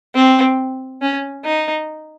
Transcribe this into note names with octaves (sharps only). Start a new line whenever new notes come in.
C4
C#4
D#4